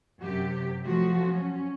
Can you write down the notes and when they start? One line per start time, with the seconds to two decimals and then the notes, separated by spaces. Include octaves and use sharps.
0.20 F#2 C3 G4
0.84 F3 F#3 A3 F#4
1.27 C#4